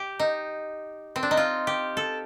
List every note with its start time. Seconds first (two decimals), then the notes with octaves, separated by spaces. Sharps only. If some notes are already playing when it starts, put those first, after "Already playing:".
Already playing: G4
0.20 D#4
1.16 C4
1.23 D4
1.31 D#4
1.37 F4
1.67 G4
1.97 A4